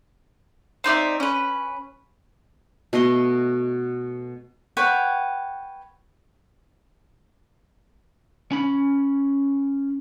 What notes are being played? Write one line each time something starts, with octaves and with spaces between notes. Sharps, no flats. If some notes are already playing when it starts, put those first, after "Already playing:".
C4 D#4 D5 E5
C#4 B4
B2 A3 D#5 C6
B4 C#5 F#5 G5
C#4 B5